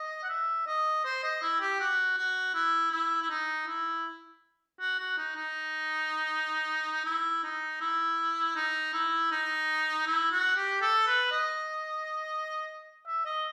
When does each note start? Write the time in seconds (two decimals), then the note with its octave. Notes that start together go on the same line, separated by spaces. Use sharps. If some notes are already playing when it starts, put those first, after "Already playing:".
Already playing: D#5
0.24 F#5
0.29 E5
0.67 D#5
1.05 C5
1.24 D#5
1.42 E4
1.61 G4
1.80 F#4
2.17 F#4
2.55 E4
2.92 E4
3.21 E4
3.30 D#4
3.67 E4
4.80 F#4
4.99 F#4
5.18 D#4
5.36 D#4
7.05 E4
7.44 D#4
7.81 E4
8.56 D#4
8.94 E4
9.31 D#4
10.07 E4
10.32 F#4
10.57 G4
10.82 A4
11.07 B4
11.32 D#5
13.07 E5
13.26 D#5